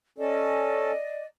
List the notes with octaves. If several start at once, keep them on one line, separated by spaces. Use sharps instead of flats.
C#4 A4 D5 D#5